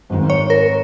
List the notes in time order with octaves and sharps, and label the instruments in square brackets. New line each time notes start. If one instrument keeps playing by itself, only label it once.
[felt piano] G#1 G#2 D#3 G#3 D#4
[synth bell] C#5
A#4